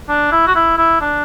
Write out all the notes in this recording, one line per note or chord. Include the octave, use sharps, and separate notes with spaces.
D4
E4
F#4
E4
E4
D4